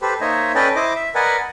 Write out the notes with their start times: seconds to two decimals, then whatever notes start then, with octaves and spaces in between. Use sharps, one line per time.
0.02 G4 A4 B4 C5
0.21 A#3 D#4 C5 C#5 D#5 E5
0.55 C#4 A4 B4 D5 D#5 G5
0.76 E4 C5 D#5 D6
0.96 E5
1.15 A#4 B4 D5 D#5 F#5 G#5